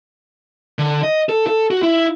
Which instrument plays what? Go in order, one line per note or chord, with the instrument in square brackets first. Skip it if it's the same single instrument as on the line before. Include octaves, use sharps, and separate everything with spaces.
[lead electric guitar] D3
D#5
A4
A4
F#4
E4